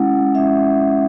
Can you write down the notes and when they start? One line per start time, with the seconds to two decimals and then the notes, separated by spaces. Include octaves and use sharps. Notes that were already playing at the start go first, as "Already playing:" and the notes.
Already playing: G#3 C#4 E4 F#5
0.34 G#3 C#4 E4 E5